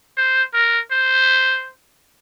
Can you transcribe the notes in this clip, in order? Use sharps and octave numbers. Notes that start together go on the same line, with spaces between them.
C5
A#4
C5